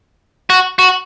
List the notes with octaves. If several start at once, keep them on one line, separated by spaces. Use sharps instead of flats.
F#4
F#4